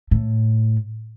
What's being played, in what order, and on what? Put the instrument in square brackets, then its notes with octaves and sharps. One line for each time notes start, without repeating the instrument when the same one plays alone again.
[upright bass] A2